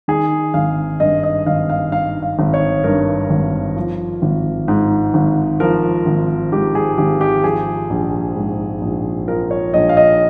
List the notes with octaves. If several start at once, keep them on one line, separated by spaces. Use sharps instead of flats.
D#3 G#4
G#1 F5
G2 D#5
D#5
G#1 F5
F5
D#3 F5
F5
G#1
C#5
G2 A#4
G#1
F3
G#1
G#2
G#1
F3 A#4
G#1
G#2 G4
G#4
G#1 G4
G4
F3 G#4
A#1
G#2
A#1
F3 A#4
C#5
A#1 D#5
F5
D#5